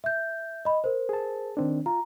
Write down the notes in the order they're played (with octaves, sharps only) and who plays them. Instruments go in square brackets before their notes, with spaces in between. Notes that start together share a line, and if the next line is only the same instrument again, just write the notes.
[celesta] E5 G6
D#5 B5
A#4 C5
[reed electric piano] G#4 A5
D#3 C4 D4
[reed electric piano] F4 [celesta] A#5